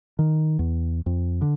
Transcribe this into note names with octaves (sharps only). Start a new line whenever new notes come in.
D#3
E2
F2
D3